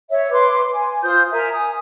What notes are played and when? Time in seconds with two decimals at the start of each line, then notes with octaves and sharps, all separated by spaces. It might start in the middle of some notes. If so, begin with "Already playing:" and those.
0.09 C#5 E5
0.32 B4 C6 D6
0.73 G#5
1.03 F4 C5 D#6 G6
1.32 A#4 E5 G#5 A#5
1.53 G#5 D#6